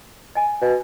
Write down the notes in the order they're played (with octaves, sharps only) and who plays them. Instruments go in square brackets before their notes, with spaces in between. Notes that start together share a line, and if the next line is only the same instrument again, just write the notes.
[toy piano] D#5 G#5
[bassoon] B2